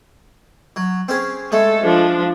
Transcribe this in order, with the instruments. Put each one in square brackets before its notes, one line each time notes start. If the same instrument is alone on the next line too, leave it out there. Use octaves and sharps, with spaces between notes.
[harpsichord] F#3
C4 C#4 G#4
[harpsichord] G#3 A3 [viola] A4
[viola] F3 D4